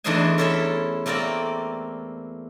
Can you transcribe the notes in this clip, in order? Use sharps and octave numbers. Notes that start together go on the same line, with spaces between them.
E2 A3 D4 D#4 C5 G#5
C#4 E4 A4 C5 E5 B5
A3 A#3 C4 A#4 D5